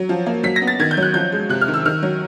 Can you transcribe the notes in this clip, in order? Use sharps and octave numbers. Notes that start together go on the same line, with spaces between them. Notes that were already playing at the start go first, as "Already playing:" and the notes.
Already playing: F#3
F3
A#3
F#3 B6
A#6
B3
A6
D#3 G#6
G6
F#3
F#6
F3 G6
G#3
C3 F#6
F6
D#3
E6
D#3 F6
F#3